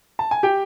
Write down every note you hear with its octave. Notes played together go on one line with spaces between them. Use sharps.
A5
G#5
G4 G5